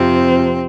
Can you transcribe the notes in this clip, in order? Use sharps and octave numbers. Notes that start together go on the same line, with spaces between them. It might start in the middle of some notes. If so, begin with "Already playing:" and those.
Already playing: F2 C3 F3 C4